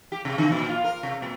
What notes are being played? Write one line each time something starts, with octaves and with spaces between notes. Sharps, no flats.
G4
C3
D3
A#2
F4
A#4
C3
A#2